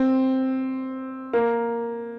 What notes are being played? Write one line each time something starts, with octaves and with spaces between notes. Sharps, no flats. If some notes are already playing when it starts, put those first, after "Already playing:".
Already playing: C4
A#3